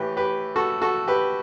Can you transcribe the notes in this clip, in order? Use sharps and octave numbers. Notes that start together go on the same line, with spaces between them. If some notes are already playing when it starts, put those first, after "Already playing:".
Already playing: A2 E3 G4 B4
G4 B4
F#4 A4
F#4 A4
G4 B4